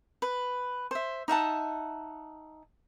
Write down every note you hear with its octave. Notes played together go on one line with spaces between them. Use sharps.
B4
C5 E5
D#4 E5 F#5 A5